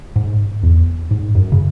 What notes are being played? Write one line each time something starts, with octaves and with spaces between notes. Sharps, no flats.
G#2
E2
G#2
F#2
C#3